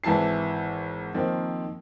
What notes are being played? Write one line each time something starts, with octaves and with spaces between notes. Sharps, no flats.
G#1 E3 E4 A5 C7
D#3 F3 A#3 C4